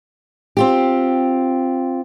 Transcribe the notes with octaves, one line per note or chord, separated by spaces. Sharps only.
C4 F4 G4